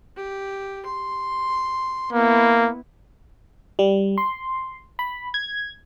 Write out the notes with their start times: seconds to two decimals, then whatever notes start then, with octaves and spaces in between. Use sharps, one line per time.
0.16 G4
0.86 C6
2.13 A#3 B3 E4
3.79 G3
4.18 C6
4.99 B5
5.34 G#6